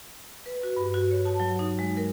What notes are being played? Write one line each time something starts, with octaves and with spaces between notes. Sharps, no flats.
B4
F#4
G2
F#4
C#5
A5
F#3
D#4
G#3
A#4